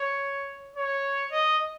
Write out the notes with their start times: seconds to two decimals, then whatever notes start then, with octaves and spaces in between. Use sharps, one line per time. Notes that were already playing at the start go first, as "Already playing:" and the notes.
Already playing: C#5
0.75 C#5
1.31 D#5